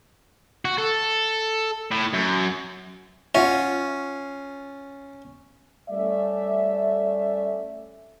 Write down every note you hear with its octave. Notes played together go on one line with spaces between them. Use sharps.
F#4
A4
A2
F#2
C#4 F4 E5 F#5 C#6
G3 A3 C#4 D5 E5